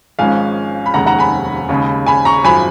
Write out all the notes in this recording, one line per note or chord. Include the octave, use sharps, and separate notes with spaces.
G#1 G#2 F3 G#3 C#4 F5 G#5
B5
F1 D#2 D#3 G#3 C#4 F#5 A#5
F#5 A#5
G#5 B5
D#2 C#3 G#3 C#4
G#5 B5
A#5 C#6
G#1 F#2 F3 G#5 B5